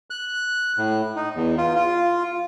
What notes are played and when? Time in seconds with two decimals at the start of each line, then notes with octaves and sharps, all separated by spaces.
0.10 F#6
0.78 A2
1.16 D#4
1.36 E2
1.58 F4
1.76 F4